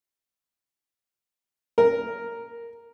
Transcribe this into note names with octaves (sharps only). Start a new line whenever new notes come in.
A#4